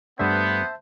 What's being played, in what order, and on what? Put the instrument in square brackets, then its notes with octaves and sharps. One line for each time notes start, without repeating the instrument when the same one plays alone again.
[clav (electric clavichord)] G2 A3 D4 [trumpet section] B3 [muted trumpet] C5 [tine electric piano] E5 A5